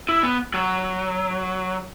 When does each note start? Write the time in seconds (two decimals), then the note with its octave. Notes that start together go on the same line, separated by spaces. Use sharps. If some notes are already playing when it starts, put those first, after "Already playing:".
0.09 E4
0.23 B3
0.54 F#3